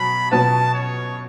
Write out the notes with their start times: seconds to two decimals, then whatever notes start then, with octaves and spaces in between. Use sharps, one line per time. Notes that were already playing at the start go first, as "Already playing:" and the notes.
Already playing: B2 F#3 B5
0.31 B2 F#3 C#4 F#4 B4 A5
0.74 C#5